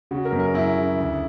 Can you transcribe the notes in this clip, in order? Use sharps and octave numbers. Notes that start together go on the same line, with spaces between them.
C#3 F#4
A#4
F#2
A#4
F#2 E4
C#3
D2